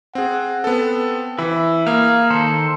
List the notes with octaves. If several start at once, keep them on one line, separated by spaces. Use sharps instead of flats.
C4 G#4 F#5
B3 C4 A4
E3 E4
A#3 G#4 F5 A#5
D#3 A4 C5